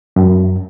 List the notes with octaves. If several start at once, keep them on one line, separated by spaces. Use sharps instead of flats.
F#2